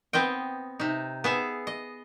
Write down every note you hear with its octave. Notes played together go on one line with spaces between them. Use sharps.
B3 C4 D#5 G5
C3 D#4
B3 G#4 E5
D#5